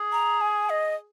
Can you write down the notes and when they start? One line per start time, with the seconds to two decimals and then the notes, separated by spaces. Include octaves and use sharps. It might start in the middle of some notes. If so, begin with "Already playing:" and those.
Already playing: G#4
0.12 A#5
0.41 G#5
0.70 D#5